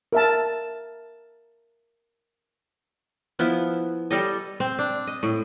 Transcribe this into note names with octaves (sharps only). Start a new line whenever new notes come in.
A#4 E5 A5
F3 B3 E4
G3 A4 D#5
C4
D4
D#5
A2